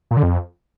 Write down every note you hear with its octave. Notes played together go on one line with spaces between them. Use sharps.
A#2
D3
F2